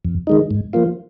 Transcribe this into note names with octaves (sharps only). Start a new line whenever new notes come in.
F2
D#3 G#3 D#4
G#2
F3 A#3 F4